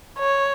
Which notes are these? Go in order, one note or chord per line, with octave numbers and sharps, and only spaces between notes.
C#5